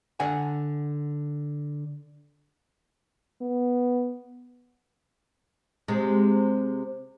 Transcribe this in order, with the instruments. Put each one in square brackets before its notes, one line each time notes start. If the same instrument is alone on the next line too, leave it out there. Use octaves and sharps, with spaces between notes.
[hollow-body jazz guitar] D3 F#5 G#5
[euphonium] B3
[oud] C3 G#3